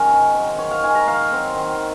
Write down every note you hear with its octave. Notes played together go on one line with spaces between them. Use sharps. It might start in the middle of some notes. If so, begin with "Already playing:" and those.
Already playing: D#3 G#3 C#4 A#4
G#2
F#3 C4
D#3 C#5
F5
G#3 D#4 G#5
A#5
D#3 F5
F#3 C4 D#4
D#3